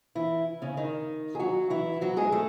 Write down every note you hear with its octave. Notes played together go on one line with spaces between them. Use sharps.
E3 E4
C#3 C#4
D#3 D#4
G#4
F#3 F#4
E3 E4
F#3 F#4
G#3 G#4
A3 A4